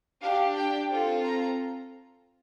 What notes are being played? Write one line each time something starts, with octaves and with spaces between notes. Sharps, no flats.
D4 G4 F5
G5
C4 F4 A4
A#5